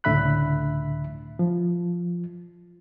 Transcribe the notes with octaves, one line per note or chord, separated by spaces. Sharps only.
C#2 A2 D3 E5 B5 F#6
F3